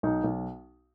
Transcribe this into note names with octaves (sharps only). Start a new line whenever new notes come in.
B1 D#4
B1